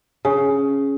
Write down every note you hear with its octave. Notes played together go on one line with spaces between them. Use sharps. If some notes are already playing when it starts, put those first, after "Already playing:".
C#3 G#4 G#5